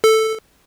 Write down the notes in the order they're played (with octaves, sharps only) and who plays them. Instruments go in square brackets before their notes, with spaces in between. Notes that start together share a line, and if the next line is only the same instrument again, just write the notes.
[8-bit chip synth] A4